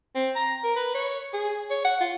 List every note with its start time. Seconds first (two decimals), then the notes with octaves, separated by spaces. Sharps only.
0.15 C4
0.36 A#5
0.64 A#4
0.76 B4
0.95 C#5
1.33 G#4
1.70 C#5
1.85 F#5
2.01 F4